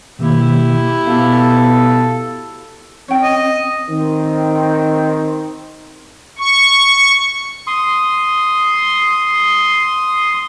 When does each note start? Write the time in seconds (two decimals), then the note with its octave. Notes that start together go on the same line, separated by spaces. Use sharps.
0.19 B2 D#3 A#3 E4 G4
1.07 B2 A4 F5
3.08 C4 C#4 G5
3.23 D#5
3.88 D#3 C4
6.38 C#6
7.67 C6 D#6